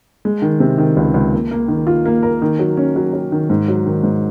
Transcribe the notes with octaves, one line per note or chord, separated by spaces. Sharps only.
G#3
D#3
C3
D#3
C#2
C#2
A#3
A#3
D#3
F4
A#3
A#4
D#3
F#3
C#4
F#3
F#3
D#3
G#2
F#3
D#3
G#2